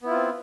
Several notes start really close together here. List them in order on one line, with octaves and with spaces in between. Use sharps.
B3 E4 F4 C4